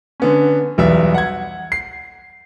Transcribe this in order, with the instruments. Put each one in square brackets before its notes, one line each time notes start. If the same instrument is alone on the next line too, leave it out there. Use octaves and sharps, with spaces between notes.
[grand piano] D3 B3 C#4
B1 E2 B2 G3 B4 E5
F#5 G#6
C7